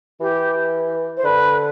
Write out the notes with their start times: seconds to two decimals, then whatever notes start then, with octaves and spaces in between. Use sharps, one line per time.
0.20 E3 G4
1.17 C5
1.24 D3 B4